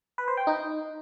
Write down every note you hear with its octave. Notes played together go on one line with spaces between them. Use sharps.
B4
C5
G5
D#4